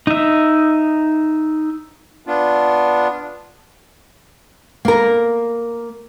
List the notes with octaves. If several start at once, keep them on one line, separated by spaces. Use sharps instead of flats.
D#4 E5
B3 D4 F4
A#3 A#4